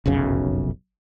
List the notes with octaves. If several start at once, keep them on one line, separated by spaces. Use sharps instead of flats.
F1 B1 F#2 C#3